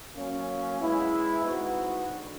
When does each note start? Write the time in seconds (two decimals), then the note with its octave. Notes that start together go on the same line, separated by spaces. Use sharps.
0.17 F#3 A#3 C#4
0.81 G#3 B3 E4
1.44 G#3 C4 D#4 F#4 B4
2.08 D3